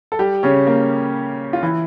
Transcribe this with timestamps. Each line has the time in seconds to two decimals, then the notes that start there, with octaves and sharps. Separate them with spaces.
0.12 A4
0.19 G3 G4
0.43 C#3 C#4
0.67 A#3
1.53 F4
1.63 E3 E4